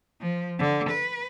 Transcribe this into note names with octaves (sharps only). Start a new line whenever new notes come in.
F3
D3
B4